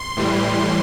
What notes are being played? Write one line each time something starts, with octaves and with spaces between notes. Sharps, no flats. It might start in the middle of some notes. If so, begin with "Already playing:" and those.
Already playing: C6
A2 E3 G3